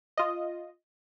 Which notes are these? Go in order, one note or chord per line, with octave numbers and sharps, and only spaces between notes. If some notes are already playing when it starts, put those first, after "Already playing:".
F4 D#5